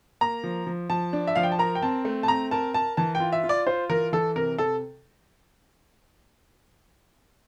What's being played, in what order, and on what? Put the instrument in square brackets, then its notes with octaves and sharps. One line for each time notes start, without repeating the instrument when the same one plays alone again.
[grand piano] A#3 [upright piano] A#5
[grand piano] F3
F3
[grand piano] F3 [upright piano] A5
[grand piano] D4
[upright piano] E5
[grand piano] F3 [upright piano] F5
[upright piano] G5
A5
[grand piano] A#4 [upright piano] A#5
[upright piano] G5
[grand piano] C4 [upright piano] A5
[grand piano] A3
[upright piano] A5
[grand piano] C4 [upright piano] A#5
[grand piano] A#4 [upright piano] A5
[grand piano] A#4 [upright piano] A5
[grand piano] E3 [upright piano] A5
[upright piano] G5
[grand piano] F4
[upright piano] E5
[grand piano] F4
[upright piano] D5
[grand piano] F4 [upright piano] C5
[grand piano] E3 [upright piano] A#4
[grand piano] E3 [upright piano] A4
[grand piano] C3 [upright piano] A#4
[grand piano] C3 [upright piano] A4